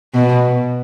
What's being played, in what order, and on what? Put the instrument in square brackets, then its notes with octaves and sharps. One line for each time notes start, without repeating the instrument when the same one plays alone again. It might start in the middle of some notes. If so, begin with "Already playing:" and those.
[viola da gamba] B2